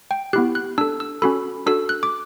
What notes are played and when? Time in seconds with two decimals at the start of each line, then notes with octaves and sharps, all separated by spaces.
0.11 G5
0.33 B3 E4 G4 F#6
0.55 F#6
0.78 D4 A4 E6
1.00 E6
1.22 C#4 F#4 A4 B5
1.66 D4 F#4 A4 E6
1.89 F#6
2.03 D6